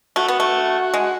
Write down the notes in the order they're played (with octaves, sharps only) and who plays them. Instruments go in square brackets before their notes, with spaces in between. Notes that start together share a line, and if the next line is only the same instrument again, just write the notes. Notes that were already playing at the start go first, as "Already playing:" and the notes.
[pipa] A3 [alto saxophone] F#4
[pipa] B3
A3
G#3